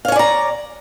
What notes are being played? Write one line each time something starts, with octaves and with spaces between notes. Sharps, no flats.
C#5 D5 F5 G#5 A#5